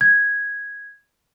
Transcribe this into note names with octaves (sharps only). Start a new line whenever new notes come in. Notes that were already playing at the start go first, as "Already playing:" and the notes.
G#6